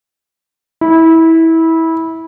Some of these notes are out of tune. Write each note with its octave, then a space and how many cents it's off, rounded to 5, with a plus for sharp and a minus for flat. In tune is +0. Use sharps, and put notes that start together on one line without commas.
E4 -20